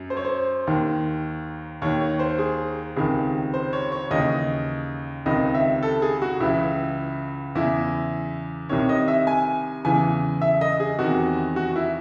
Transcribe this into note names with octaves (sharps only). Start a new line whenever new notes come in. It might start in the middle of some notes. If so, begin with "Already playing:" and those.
Already playing: F#2
C5
C#5
C5
D#2 D#3
D#2 D#3 C#5
C#5
C5
G#4
C#2 C3 D#3 G#4
C5
C#5
C#5
D#2 C#3 E3 D#5
C#2 C3 D#3 D#5
E5
A4
G#4
F#4
C#2 C#3 E3 E4
E2 C#3 E3 E4
C2 C3 D#3 C#5
D#5
E5
G#5
E2 C#3 E3 G#5
E5
D#5
G#4
E2 C3 D#3 F#4
F#4
E4